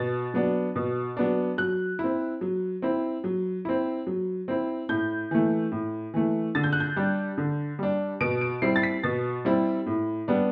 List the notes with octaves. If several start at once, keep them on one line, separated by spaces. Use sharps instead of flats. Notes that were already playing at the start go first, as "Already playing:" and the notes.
Already playing: B2 A6
F#3 B3 D4
B2
F#3 B3 D4
F#3 F#6
E4
C4
F#3
C4 E4
F#3
C4 E4
F#3
C4 E4
A2 G6
E3 A3
A2
E3 A3
D3 A6
G6
F#6
G6
G3 D4
D3
G3 D4
B2 D7
D7
G3 C4 E4 C7
A6
B6
B2 A6
G3 C4 E4
A2
G3 B3 D4